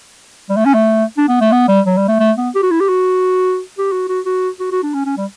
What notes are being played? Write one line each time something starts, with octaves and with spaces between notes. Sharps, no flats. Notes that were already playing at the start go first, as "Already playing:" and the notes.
G3
A3
C#4
A3
D4
B3
A3
B3
G3
F#3
G3
A3
A3
B3
G4
F#4
E4
G4
F#4
G4
F#4
F#4
F#4
F#4
F#4
D4
C#4
C#4
G3